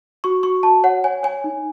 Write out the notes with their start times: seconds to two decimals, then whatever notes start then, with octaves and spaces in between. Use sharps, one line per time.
0.24 F#4 C#6
0.43 F#4 C#6
0.63 F#4 A5
0.84 C#5 F#5
1.04 C#5 G#5
1.23 C#5 G#5
1.44 D#4